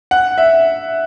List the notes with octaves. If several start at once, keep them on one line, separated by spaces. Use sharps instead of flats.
F#5
E5